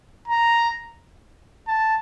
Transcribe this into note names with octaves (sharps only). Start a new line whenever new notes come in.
A#5
A5